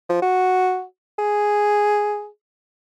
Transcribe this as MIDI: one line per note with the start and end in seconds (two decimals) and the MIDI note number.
0.09 0.19 53
0.22 0.83 66
1.19 2.28 68